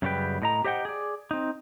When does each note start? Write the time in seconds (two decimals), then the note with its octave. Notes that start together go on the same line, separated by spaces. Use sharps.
0.02 F#2 C#3 G3 F#4 B4 G5
0.42 A2 D#5 A#5
0.64 G4 C5 D#5 F#5 G5
0.85 G#4 D5
1.31 C4 D#4